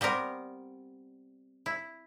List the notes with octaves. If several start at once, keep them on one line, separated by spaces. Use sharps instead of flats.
G3 B3 C4 A#4
E4